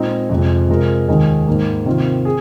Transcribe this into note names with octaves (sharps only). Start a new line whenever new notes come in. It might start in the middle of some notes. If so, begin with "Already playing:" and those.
Already playing: A#2 G#3 C4 D#4 G#4
F2 C3 F3 G#3
C3 G#3 F4 A#4
D#2 D#3 G#3 D#4
G#2 D#3 A#3
C3 D#3 C4 F4
G#4